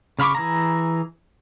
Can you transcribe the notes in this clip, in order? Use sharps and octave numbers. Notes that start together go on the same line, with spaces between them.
C#3 F5 B5 C#6 D6
E3 G#4 A#5